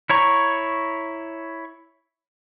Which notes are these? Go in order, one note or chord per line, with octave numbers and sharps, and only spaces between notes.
E4 C#5 A#5 C#6